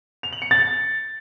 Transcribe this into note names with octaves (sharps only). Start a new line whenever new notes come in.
F7
F#7
C#7
A6